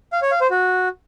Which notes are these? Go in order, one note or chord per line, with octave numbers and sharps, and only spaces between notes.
F5
C#5
F5
C5
F#4